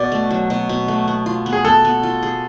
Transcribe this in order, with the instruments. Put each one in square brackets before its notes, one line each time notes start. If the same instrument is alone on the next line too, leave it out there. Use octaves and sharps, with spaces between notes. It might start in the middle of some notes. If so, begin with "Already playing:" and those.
Already playing: [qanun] B2 [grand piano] D5
[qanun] A3
F#3
B2
B2
A3
B3
F4
B3
[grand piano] G#4
[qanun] B3 [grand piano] A4
[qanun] B3
F4
G#4